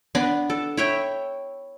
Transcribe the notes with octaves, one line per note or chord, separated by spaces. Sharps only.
B3 D4
A4
E4 C#5 G5